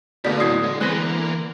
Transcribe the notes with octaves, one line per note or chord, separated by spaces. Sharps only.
B2 D3 A3 A#3 D#4 D5 B6
A2 F#3 D#6 G#6 C7
D3 G#3
E3 G#3 B3 C4 F#6 A#6
A#3